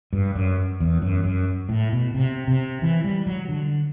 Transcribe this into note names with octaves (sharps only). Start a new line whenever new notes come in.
G2
F#2
E2
F#2
F#2
A2
B2
C3
C3
E3
G3
F#3
D3